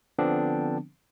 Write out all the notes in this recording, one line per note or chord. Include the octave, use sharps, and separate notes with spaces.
D3 F3 B3 C4 D4